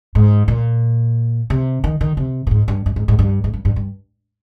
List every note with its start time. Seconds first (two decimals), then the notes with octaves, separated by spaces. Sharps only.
0.15 G#2
0.48 A#2
1.50 C3
1.84 D#3
2.01 D#3
2.17 C3
2.47 A#2
2.51 G#2
2.68 G2
2.86 G2
2.96 G#2
3.08 G#2
3.19 G2
3.44 G#2
3.53 G2
3.65 G2
3.76 G2